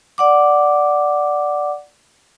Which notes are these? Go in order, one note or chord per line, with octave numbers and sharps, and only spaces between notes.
D5 F#5 D6